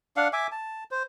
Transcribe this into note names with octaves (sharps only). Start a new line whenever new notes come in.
D4 F5 F#5
E5 G#5 D6
A5
C5